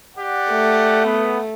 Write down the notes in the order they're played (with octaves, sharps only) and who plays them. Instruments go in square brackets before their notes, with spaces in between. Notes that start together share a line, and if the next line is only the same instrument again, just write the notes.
[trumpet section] G4 D5 F#5
[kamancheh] A3
[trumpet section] B3